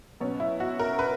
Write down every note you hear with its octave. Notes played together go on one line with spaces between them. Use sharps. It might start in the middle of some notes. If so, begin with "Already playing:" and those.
B2 F#3 B3 C#4
E4
F#4
A#4
B4